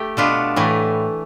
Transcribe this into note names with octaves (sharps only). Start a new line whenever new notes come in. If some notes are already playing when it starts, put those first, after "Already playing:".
Already playing: A3 G4
B2 B3 D4 F4 A4
A2 E3 A3